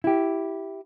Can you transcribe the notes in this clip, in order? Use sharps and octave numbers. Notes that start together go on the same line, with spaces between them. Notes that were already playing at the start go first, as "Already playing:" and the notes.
E4 G4